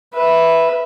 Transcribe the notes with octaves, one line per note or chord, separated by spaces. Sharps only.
B4 E5